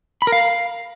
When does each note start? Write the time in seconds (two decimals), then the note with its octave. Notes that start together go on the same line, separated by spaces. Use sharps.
0.22 B5
0.27 A#4
0.32 F5